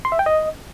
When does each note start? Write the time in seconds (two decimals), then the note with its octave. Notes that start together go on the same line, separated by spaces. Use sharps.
0.05 C6
0.12 E5
0.19 G5
0.26 D#5